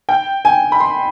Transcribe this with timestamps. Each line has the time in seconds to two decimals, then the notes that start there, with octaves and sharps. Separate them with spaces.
0.09 G5
0.45 G#5
0.72 B5
0.80 C6